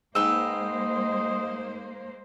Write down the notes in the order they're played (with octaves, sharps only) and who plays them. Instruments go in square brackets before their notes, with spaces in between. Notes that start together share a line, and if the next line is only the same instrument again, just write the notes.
[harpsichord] G#2 [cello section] G#3 A#3 C5 [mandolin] B4 G5 E6 [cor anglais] D#5